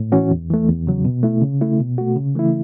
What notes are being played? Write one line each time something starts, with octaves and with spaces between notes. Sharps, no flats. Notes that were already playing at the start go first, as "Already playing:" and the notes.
Already playing: A2
E3 C#4 F#4
E2
E3 A3
E2
C#3 F#3
B2
A3 E4
C#3
A3 E4
B2
A3 F#4
C#3
E3 A3 E4